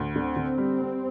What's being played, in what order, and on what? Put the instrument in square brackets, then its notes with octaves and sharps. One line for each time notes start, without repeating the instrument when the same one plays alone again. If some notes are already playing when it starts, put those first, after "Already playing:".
Already playing: [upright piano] D2
[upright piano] D3 [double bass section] C4
[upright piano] D3
G3
G3